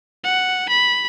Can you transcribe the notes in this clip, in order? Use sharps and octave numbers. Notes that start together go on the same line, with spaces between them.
F#5
B5